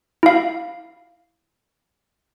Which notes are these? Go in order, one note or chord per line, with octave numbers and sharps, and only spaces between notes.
E4 F5